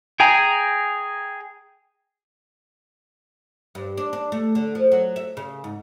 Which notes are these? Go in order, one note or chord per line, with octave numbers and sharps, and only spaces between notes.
G#4 G5 G#5 A#5
G2
D4
D4
A3
D3
F3
F#3
E5
C#3
G#2